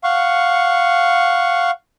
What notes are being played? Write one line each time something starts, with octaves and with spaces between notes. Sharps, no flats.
F5 F#5 C#6